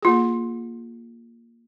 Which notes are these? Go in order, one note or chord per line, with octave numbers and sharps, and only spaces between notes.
A#3 F4 G#4